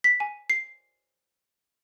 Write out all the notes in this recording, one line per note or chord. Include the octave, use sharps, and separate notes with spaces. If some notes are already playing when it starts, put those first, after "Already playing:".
B6
G#5
C7